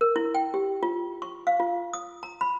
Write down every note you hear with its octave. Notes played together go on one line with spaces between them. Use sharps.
A#4
E4
G5
G4
F4
C#6
F5
F4
D#6
A#5
B5